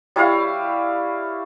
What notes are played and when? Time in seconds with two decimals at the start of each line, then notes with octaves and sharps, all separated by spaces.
0.16 G3 E4 C#5 F5